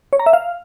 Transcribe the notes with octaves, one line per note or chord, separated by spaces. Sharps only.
C#5
A#5
E5
F5